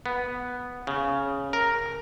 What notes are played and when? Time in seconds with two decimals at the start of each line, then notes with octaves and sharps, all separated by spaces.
0.06 B3
0.87 C#3
1.53 A#4